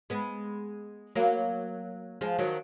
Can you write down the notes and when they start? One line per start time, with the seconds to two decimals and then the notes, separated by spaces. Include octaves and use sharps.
0.10 G#3 B3
1.15 F#3 A#3
2.21 F3 G#3
2.39 D#3 F#3